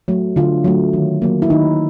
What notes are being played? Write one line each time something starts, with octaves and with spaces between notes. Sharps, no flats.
F#3 A3
D3 F4
F#3 A3
D#3
F#3 A#3
E4
D#3 D#4